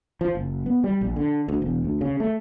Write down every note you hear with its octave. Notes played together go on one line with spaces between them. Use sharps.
F3
F#1
B3
G3
A#1
D3
D2
E1
D2
C#3
A3